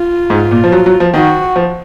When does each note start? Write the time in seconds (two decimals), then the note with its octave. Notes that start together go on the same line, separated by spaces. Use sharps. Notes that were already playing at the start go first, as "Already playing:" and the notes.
Already playing: F4
0.30 G#2
0.51 A#2
0.64 F3
0.72 F#3
0.86 F#3
1.00 F3
1.14 D#3 F#4
1.56 F3